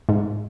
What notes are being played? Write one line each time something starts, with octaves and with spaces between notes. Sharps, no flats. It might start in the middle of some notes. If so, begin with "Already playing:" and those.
G#2